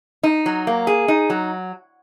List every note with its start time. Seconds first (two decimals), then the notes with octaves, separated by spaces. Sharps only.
0.23 D#4
0.46 F#3
0.67 A#3
0.87 G#4
1.08 D#4
1.30 F#3